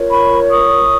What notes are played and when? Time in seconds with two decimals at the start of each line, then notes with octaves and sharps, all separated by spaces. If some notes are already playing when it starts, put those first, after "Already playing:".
Already playing: F4 A#4 C#5
0.09 B5 C#6
0.51 C#6 D#6